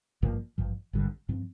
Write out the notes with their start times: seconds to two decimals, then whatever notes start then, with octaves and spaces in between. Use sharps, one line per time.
0.22 G#1 G2 F3 A#3
0.58 G#1 G2 F3
0.93 G#1 G2 D3
1.29 G2 F3 C4